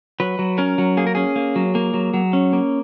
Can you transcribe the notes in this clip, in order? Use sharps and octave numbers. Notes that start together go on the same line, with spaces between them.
F#3 B4
F#3
C#4 A#4
F#3
A#3 G#4
A#4
C#4 G#4
A#3
F#3
A#3
F#3
F#3
C#4
A#3